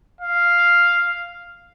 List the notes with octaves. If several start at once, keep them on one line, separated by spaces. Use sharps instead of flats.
F5